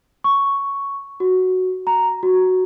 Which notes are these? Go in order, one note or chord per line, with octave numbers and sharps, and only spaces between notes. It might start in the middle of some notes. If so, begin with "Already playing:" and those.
C#6
F#4
A#5
F#4